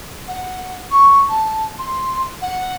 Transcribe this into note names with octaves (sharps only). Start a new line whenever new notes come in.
F#5
C#6
A5
C6
F#5